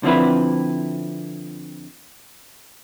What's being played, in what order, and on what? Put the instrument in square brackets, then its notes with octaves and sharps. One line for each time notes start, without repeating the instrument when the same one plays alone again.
[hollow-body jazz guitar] D3 F3 C4 E4 B4